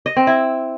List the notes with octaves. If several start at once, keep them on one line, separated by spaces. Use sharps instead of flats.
D#5
C4
E4